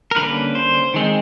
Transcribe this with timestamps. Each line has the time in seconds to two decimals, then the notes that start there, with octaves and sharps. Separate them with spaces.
0.11 A#4
0.16 D3 G3 A#3 C#4 B4
0.55 C5
0.94 D#3 G#3 C4